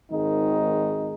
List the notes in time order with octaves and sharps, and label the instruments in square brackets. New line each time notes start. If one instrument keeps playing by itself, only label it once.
[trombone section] G#1 D#3 G#3 D#4